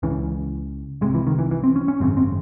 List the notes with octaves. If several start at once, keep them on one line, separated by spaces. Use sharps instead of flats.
C#2 C#3 E3
C2 C3 G#3
E3
D#3
E3
E3
C4
C#4
C#4
G#1 F#2 C#3 C4
C4